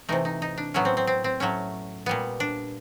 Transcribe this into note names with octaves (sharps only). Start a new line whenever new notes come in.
C3 E3 A3 D#4
D#4
D#4
D4
A2 F#3 B3 C#4
C4
C4
C4
C4
A2 F#3 A3 C#4
A#2 G3 B3
D4